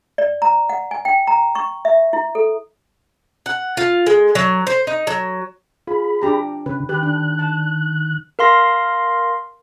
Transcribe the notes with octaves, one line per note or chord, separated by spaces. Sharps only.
D5
A#5
F#5
G#5
G5
A#5
C#6
E5
E4
A4
F#5
F4
G#3
F#3
C5
D#4
F#3
F4 G#4 B5
D4 G4 A#5
C#3 C#4 B4
D#3 G4 B4 F#6
D4
A5
A#4 F5 C6 A#6